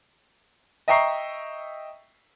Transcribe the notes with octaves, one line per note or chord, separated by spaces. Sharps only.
D#5 E5 G5 A#5 C#6 C7